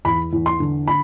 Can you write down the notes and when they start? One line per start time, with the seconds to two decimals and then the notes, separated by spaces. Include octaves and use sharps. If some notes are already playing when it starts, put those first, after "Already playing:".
0.05 E2 B5
0.33 E2
0.46 C6
0.60 D3
0.87 B5